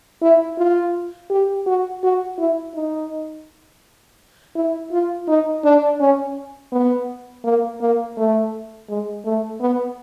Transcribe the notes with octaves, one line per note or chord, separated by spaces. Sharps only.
E4
F4
G4
F#4
F#4
E4
D#4
E4
F4
D#4
D4
C#4
B3
A#3
A#3
A3
G#3
A3
B3